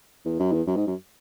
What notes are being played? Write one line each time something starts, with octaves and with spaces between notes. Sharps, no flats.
E2
F#2
E2
F#2
G#2
F#2